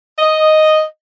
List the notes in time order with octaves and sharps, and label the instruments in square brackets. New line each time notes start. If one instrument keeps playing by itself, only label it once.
[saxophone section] D#5